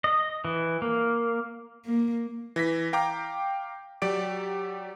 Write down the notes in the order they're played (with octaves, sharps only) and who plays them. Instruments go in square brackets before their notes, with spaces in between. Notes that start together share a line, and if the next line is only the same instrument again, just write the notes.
[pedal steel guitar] D#5
E3
A#3
[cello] A#3
[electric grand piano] E3 A#6 B6
F5 G5 A#5 D6
F#3 G4 D5 D7